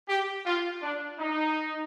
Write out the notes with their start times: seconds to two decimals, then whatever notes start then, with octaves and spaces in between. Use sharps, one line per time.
0.09 G4
0.46 F4
0.83 D4
1.19 D#4